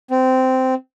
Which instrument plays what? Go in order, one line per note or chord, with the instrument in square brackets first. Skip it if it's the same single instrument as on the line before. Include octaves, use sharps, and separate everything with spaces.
[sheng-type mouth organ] C4